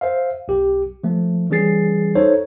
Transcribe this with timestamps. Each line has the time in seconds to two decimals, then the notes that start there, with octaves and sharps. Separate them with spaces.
0.01 C5 E5 F5
0.48 B1 G4
1.04 F3 A3
1.50 E3 G3 C#4 G#4 A6 C7
2.15 D#4 A4 C5 C#5